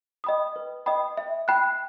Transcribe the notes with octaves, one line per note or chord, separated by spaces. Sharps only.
D#5 G5 B5 D#6
B4
D#5 G5 B5 D#6
E5
G5 B5 F#6